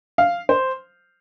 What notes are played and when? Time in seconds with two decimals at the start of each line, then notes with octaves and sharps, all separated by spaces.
0.18 F5
0.49 C5